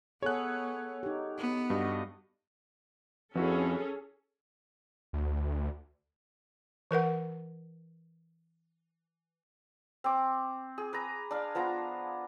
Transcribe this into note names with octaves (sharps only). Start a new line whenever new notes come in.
B3 G#4 A4 C#5 F#5 F#6
D#4 G4
B3
G2 F#4 G4 D#5
F2 C#4 E4 F#4 G#4 A4 B4
D2
E3 A#4 B4 F#5
C4 D6
G#4
B4 A#5
D4 F5
F3 B3 A#5